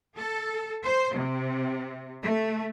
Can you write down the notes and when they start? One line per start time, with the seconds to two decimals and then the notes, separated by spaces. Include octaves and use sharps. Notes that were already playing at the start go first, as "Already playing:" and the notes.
0.16 A4
0.83 C5
1.14 C3
2.23 A3